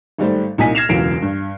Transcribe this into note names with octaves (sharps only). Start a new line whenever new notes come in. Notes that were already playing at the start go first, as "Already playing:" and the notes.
G#1 G#2 G3 A3 C5
C2 A#2 D#4 G#5 B6
F6 G#6 A#6 C7 E7 F7
E1 C#2 E3 F#3 C7 D7
G2